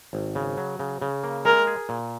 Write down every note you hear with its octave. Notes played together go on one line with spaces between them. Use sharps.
G#1
C#3
F#3
C#3
C#3
A#3
G#3 A#4
G#4
A#2